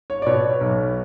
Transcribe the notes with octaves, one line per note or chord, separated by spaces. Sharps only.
C#5
D5
B2 C#5
C#5
B1